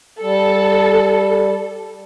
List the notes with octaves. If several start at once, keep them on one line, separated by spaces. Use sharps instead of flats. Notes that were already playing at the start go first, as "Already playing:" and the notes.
G3 A4